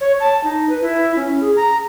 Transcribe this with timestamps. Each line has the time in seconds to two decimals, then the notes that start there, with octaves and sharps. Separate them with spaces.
0.01 C#5
0.20 A5
0.44 D#4
0.69 B4
0.81 E4
1.16 C#4
1.41 G#4
1.56 A#5